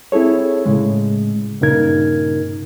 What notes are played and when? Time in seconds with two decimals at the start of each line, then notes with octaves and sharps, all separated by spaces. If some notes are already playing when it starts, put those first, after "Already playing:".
0.12 C4 E4 G#4 A4 C#5
0.66 A2 C#3 G#3
1.61 G2 A#2 C#3 D#4 A#4 G#6